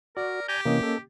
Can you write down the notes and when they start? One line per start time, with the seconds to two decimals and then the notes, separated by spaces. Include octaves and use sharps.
0.17 F#4 A#4 D5
0.48 G4 G#5 A#5 G6
0.65 C3 E3 A#3 C#4 D#5
0.83 A4